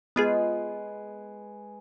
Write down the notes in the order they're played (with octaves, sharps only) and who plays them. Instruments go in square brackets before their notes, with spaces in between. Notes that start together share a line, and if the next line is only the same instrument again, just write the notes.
[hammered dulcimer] G#3 B4 [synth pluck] B3 F4 G#4